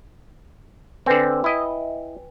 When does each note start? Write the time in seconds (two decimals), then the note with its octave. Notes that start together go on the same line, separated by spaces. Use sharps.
1.06 D3 C4 B4 G5 G#5
1.44 E4 D#5